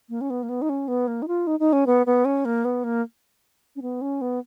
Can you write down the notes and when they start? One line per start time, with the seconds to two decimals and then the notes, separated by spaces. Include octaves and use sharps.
0.09 A#3
0.21 C#4
0.30 B3
0.43 A#3
0.49 B3
0.62 D#4
0.69 C#4
0.88 B3
1.07 A#3
1.22 D#4
1.28 F4
1.47 D#4
1.59 D#4
1.73 C#4
1.87 B3
2.06 B3
2.25 C#4
2.45 A#3
2.65 B3
2.84 A#3
3.76 C#4
3.82 B3
4.01 C#4
4.21 B3